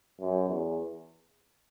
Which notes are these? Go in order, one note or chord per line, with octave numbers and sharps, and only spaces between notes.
F#2
E2